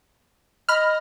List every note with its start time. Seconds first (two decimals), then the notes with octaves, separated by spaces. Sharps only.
0.69 D#5 B5 F6